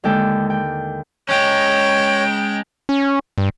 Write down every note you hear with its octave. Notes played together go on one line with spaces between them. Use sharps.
D#2 D3 G#3 A4 G5
G5
G#3 C#4 C#5 G5
C#4
G2